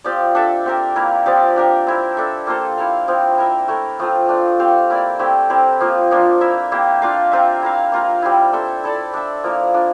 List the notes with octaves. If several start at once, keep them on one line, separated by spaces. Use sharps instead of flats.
F3 C4 G4 D5
D4 A4 E5
C4 G4 A#4
A#3 E4 A#4
F3 C4 G4 D5
D4 G4 A#4
C4 E4 A#4
D4 A4 E5
A#3 F4 A4 C5
E4 A#4 F5
F3 C4 E4
E4 A#4 E5
A3 E4 A#4
F3 A3 C4 F4
A3 D4 F4
C4 G4 C5 F5
A#3 E4 A#4 D5
A3 C4 E4 G4
C4 E4 G4 A#4
F3 A#3 F4
F3 A#3 D4 F4
E4 A#4 E5
A#3 E4 G4
D4 F4 A#4 F5
C4 F4 A#4 E5
E4 A#4 F5
A#3 F4 A#4
G3 C4 E4
D4 A4 C5 E5
E4 A4 D5
D4 A4 E5
F3 A#3 E4 A#4
D4 F4 A#4